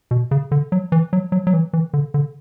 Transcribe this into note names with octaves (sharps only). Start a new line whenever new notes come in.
B2
C#3
D3
F#3
E3
F#3
F#3
F#3
E3
E3
D3
D3